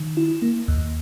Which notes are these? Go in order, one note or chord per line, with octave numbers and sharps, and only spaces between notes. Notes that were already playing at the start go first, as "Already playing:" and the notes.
Already playing: D#3
E4
A#3
D#2